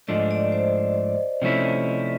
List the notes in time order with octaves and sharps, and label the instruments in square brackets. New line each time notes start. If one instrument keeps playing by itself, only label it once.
[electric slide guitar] G#2 F3 A3 D4 [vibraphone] D#5
[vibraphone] D5
C5
[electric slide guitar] C3 F3 A3 C#4 E4